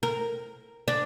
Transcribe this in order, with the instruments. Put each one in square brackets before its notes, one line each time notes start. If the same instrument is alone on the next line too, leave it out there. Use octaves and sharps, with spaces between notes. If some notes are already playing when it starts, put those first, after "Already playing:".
[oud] A#4
D4